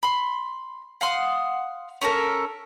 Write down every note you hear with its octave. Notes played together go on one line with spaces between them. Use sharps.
B5 C6
F5 F#5 C6 D#6
C#4 F4 A4 A#4